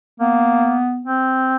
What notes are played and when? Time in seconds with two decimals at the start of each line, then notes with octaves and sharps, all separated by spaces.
0.20 A#3 B3
1.05 C4